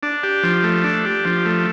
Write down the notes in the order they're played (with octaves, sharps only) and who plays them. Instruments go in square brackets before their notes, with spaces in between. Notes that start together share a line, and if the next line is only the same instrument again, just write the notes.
[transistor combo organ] D4
G4
F3
A3
D4
G4
F3
A3